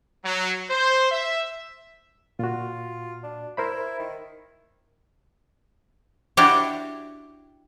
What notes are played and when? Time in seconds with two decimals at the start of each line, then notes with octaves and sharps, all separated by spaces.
0.23 F#3
0.69 C5
1.11 E5
2.39 A#2 F4 F#4
3.23 D4
3.57 E4 A#4 C5 B5
3.99 D#3
6.37 D4 E4 F#4 G4 C#5